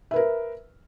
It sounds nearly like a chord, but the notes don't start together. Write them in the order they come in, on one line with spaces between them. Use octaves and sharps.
E5 B4 A#4